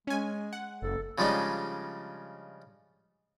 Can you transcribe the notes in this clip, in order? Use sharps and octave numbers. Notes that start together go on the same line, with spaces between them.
G#3 C#4 G#5
F#5
F#1 A4
C#3 F3 G3 G#3 D4 D#4